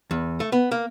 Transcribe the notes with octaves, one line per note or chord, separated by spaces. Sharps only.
E2
A3
B3
A#3